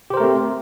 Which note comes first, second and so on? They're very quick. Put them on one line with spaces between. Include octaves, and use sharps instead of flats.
G4 C5 A#4 A3 C4